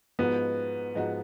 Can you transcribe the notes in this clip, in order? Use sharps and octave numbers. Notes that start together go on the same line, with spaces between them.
G#2 F3 G#3 B3 D#4 F#4
G#2 F3 G#3 D#4 F#4